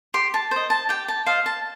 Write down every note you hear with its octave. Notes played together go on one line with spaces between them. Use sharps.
G4 C6
A5
C5 D#5
A5
G4 G5
A5
C5 D#5 F5
A5